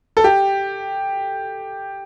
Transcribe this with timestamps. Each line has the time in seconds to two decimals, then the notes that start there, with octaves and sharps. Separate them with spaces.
0.17 A4
0.24 G4